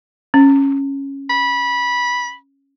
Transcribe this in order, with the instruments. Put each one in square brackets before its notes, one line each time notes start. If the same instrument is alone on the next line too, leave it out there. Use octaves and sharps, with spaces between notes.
[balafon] C#4
[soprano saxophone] B5